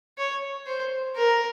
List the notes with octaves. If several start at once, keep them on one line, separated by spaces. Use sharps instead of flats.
C#5
C5
A#4